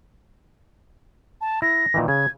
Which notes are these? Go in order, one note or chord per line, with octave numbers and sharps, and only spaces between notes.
A5
E4 A#6
A#2 D#3 E3
C#3 G#6